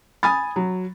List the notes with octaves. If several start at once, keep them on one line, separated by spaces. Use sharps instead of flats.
G#5 B5 D#6 A6
F#3